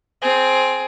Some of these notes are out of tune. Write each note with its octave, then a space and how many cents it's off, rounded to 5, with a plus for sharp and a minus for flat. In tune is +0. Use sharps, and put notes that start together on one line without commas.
C4 +0 G#4 +20